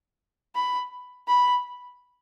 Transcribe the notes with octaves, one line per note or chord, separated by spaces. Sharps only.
B5
B5